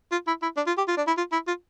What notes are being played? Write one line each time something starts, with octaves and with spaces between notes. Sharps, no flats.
F4
E4
E4
D4
F4
G4
F4
D4
E4
F4
E4
F4